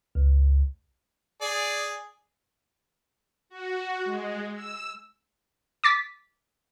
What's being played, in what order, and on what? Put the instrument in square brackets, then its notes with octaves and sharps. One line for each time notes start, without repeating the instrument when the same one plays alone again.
[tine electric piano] C#2
[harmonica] G#4 D5
[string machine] F#4
G#3
E6
[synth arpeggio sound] D6 A6 B6